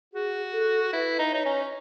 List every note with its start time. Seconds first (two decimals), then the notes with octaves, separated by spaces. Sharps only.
0.14 F#4 G#4
0.53 A4
0.93 E4 B4
1.19 D#4
1.31 D#4 C#5
1.46 C#4